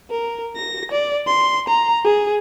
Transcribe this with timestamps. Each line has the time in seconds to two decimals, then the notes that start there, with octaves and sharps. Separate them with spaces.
0.11 A#4
0.56 A#6
0.92 D5
1.27 C6
1.68 A#5
2.04 G#4